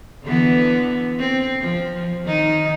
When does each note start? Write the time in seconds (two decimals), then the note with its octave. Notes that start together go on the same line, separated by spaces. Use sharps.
0.24 D3 E3 B3
1.19 C4
1.61 F3
2.24 D#3 D#4